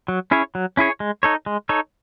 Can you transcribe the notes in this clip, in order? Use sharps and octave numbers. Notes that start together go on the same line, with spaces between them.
F#3
C#4 E4 G#4 C#5
F#3
C#4 E4 G#4 C#5
G#3
D#4 A4 C#5
G#3
D#4 A4 C#5